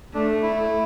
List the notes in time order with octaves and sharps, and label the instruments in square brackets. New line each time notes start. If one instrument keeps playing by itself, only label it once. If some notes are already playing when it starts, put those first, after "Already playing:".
[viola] A3 [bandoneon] D4
[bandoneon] E4
[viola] A3